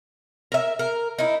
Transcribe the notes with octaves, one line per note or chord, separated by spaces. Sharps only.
A#4 E5
A#4
D#4 E4